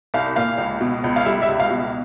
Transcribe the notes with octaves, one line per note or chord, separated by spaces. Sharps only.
C2 F5
A#2 F5
C#2
B2
C#2
F5
G3 E5
E5
C#2
F5
B2